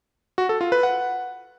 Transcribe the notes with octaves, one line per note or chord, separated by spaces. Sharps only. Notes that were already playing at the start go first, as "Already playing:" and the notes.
F#4
A4
F4
B4
F#5